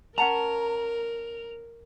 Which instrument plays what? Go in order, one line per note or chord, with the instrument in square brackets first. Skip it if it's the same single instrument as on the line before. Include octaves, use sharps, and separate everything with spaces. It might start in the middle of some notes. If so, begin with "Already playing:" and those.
[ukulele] C#4 F#5 A5 [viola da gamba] A#4 [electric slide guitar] A#5